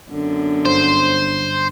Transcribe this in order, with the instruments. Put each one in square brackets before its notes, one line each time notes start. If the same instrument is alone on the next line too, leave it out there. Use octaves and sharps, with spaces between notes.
[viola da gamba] F#2 D3 B3
[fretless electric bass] G1 [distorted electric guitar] C5